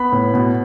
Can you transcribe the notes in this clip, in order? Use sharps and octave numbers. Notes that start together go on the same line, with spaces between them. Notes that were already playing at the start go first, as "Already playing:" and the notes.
Already playing: B3 B5
A2
B2